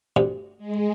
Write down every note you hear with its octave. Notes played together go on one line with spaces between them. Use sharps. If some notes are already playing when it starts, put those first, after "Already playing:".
D2 G2 C3
G#3